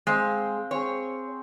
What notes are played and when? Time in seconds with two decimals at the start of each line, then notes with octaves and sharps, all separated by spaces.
0.07 G#3 C4 F5 G5
0.71 C4 G#4 C#5